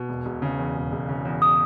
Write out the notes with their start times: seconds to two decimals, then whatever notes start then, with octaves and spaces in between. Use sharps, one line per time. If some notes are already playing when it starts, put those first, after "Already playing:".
Already playing: B2
0.09 E1
0.25 E1
0.42 C#3
0.59 E2
0.75 E1
0.92 E1
1.09 C#3
1.25 E2
1.42 D#6